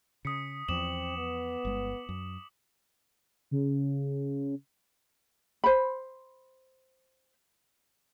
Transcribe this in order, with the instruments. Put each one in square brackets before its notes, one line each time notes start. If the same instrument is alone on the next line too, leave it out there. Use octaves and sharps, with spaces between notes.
[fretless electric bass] C#3 [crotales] D#6 B6 C#7
[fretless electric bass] E2 F3 [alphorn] C4 [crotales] D6 E7 F#7
[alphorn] B3
[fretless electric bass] G1 G#3
F#2
[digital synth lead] C#3
[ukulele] C5 B5